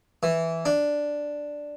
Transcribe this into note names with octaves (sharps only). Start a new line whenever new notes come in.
E3
D4